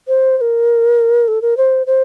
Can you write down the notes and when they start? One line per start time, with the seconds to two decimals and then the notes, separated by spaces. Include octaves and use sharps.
0.08 C5
0.37 C5
0.41 A#4
1.28 A4
1.42 A#4
1.57 C5
1.87 C5